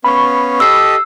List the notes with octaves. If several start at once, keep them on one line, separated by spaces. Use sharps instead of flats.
B3 C#4 F5 B5 C#6
G4 A4 D#5 E6 C7